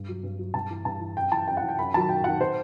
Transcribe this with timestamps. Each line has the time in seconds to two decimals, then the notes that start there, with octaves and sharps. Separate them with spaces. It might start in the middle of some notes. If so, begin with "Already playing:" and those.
Already playing: G2
0.09 F#3
0.23 G2
0.39 F#3
0.54 G2 A5
0.70 E3
0.85 G2 A5
1.01 E3
1.16 F#2 G5
1.32 E3 A5
1.47 F#2 G5
1.57 F#5
1.62 E3
1.69 G5
1.79 F#2 B5
1.94 D#3 F#3 A5
2.09 F#2 G5
2.24 D#3 F#3 F#5
2.41 C5